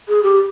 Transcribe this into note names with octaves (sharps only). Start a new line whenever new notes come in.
G#4
G4